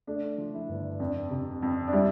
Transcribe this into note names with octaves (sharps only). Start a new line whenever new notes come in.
A3 D4
F3
E4
G1
F2 D4
C3
F2
D4
G3 E4